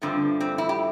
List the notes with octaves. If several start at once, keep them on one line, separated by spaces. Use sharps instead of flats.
G2 D3 F3 A3 C4
C4
E4
G4